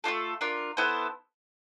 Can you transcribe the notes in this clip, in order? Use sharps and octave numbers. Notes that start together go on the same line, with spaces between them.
A3 D4 F4 A4
D4 F4 A#4
B3 E4 A4 C5